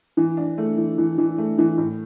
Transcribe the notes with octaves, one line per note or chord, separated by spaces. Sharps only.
E3
D4
A3
E3
E3
E3
A3
E3
A2